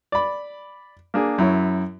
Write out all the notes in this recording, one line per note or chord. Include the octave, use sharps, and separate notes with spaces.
D5 B5
A#3 D4 G#4
F#2 E4 C#5